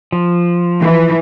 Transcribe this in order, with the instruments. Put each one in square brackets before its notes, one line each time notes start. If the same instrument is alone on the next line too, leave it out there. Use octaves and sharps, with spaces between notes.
[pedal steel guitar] F3
[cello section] E3